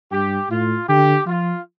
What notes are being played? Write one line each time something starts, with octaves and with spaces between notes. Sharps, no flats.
G2 G4
A2 F4
D3 G4
F3 F4